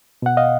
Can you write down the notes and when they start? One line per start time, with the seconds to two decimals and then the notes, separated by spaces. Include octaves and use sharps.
0.22 B2 F#5
0.37 D#5 F5